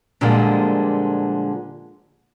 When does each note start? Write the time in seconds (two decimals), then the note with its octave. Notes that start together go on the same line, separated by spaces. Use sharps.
0.21 A#2 D3 F3 G3 G#3 A#3